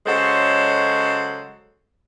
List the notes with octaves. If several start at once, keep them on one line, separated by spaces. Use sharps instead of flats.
C#3 F#3 G#3 F#4 A4 C5